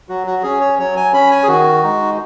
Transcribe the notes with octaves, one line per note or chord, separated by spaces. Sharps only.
F#3 F#4
F#4
C#4 G#4
C#5
F#3 C#5
G#5
C#4 B5
G#5
G#4
D#3 F#4
G#3 D#4